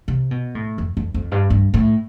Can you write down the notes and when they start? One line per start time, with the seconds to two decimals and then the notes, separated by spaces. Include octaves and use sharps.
0.08 C3
0.31 B2
0.55 A2
0.78 F2
0.97 F2
1.14 F2
1.32 G2
1.50 G2
1.74 A2